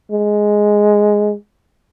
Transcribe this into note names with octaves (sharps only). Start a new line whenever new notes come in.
G#3